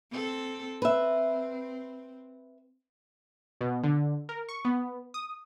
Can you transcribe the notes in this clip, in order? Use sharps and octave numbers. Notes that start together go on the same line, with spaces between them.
C4 A4
C4 B4 E5
B2
D3
A#4
C#6
B3
D#6